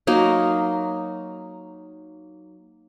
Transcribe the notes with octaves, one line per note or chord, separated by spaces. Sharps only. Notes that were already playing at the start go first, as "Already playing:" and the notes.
F#3 A#3 D#4